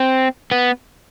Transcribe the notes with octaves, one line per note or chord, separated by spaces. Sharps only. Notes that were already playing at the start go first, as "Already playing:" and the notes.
Already playing: C4
B3